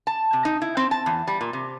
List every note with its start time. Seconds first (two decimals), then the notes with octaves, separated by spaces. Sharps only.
0.07 A5
0.33 C3
0.45 D#4
0.62 E4
0.77 C4
0.91 A5
1.06 E2
1.28 G3
1.41 A#2
1.53 C3